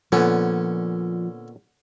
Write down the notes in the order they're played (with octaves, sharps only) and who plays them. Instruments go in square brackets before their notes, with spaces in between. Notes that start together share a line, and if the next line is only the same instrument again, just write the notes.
[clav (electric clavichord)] A#2 B3 [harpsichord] D3 C#4 [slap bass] F3